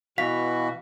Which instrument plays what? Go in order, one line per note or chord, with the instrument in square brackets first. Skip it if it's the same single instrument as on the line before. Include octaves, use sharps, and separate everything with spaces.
[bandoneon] B2 E3 F#4 [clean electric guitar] F5 [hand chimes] B6